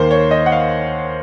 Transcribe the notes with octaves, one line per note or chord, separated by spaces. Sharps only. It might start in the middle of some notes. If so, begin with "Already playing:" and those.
Already playing: D#2 D#3 A#3 C5
C#5
D#5
F#5
F5